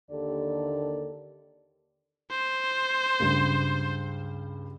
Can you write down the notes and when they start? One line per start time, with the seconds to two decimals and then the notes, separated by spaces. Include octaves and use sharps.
0.11 D#2 D3 A#3 G4 A4 D5
2.31 C5
3.20 C#2 G2